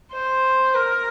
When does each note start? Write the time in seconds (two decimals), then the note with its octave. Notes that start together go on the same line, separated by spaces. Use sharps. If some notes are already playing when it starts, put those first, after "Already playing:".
0.13 C5
0.75 A#4